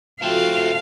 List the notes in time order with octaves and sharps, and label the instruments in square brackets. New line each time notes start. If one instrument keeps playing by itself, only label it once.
[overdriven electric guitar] A3 C4 [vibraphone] F4 F#4 A4 [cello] F5